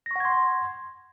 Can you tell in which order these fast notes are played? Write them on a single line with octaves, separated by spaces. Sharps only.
A#6 C#6 F#5 G#6 C6